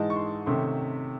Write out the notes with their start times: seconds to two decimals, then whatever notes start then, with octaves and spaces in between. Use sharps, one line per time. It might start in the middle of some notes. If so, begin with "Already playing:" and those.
Already playing: G#2 E3 G#3 D#4 A5
0.10 C#6
0.16 C6
0.46 C3 D#3 A3 C#4 C6